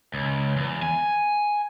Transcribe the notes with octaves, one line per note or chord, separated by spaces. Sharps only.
C#2
E2
G#5